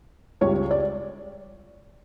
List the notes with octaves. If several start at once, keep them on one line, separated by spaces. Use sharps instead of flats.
C#2 C#3 G3 C#5
D5